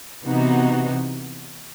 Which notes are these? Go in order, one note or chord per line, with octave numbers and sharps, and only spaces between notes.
C3 E3 B3 D#4 F#4